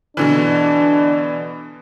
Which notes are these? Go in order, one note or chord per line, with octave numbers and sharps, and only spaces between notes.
B2 D3 E3 D4